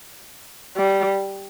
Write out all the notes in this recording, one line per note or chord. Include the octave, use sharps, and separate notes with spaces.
G3